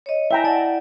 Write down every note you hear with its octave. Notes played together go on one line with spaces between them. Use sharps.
C#5 D#5
E4 E5 G5 G#5 A#5
E4 D5 F#5 A5